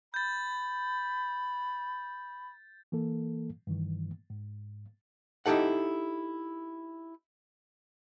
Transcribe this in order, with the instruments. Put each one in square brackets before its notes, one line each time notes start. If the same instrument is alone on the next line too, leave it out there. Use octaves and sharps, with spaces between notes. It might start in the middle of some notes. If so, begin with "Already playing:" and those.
[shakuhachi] B5 [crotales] G6 A6
[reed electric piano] E3 A#3 A4
G2 D#3 E3
G#2
[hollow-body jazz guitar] D#4 E4 G4 A4 F#5